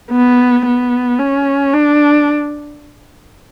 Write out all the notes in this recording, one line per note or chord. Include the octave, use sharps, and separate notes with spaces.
B3
B3
C#4
D4